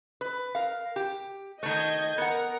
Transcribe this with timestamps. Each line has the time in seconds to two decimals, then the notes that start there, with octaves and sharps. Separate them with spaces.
0.21 B4
0.55 A#4 F5
0.96 G4
1.63 D#3 A3 D#5 G6 G#6
2.18 B3 A#4 F#5